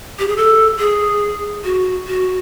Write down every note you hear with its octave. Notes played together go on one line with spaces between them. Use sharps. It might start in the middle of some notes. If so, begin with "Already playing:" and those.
G4
G#4
A4
G#4
F#4
F#4